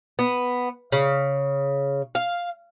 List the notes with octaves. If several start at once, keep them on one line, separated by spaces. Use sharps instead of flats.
B3
C#3
F5